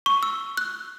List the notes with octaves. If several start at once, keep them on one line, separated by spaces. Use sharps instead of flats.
C#6
E6
F#6